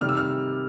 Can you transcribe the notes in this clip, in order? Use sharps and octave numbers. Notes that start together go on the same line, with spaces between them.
C3 D#3 G3 F6
E6
F6